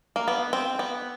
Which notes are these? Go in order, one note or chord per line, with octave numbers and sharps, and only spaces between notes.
A#3
B3
C4
B3